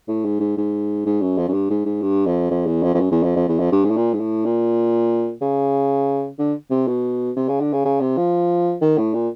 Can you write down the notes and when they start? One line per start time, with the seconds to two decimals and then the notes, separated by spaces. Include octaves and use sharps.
0.08 A2
0.25 G#2
0.40 G#2
0.57 G#2
1.05 G#2
1.21 F#2
1.37 F2
1.48 F#2
1.53 G2
1.70 G#2
1.85 G#2
2.02 G2
2.26 F2
2.51 F2
2.66 E2
2.83 F2
2.94 F2
3.00 F#2
3.11 E2
3.23 F2
3.36 F2
3.48 E2
3.59 F2
3.72 G2
3.85 G#2
3.90 A2
3.96 A#2
4.14 G#2
4.20 A2
4.45 A#2
5.41 C#3
6.39 D3
6.71 C3
6.88 B2
7.36 C3
7.49 C#3
7.61 D3
7.73 C#3
7.85 C#3
8.00 C3
8.17 F3
8.82 D#3
8.98 A2
9.14 A#2